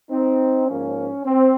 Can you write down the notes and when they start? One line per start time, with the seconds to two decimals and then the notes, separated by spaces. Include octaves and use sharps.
0.10 C4 D#4
0.67 G#2 F3 A#3 C#4
1.26 C4